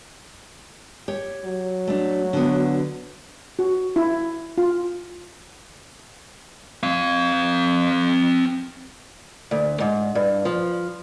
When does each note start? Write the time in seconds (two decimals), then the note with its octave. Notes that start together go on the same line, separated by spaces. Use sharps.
1.08 G4 C#5
1.45 F#3
1.87 A3 D4
2.33 D3 B3
3.59 F#4
3.96 E4
4.58 F4
6.83 C4 F5
9.51 D2
9.80 G#2
10.15 G2
10.45 F3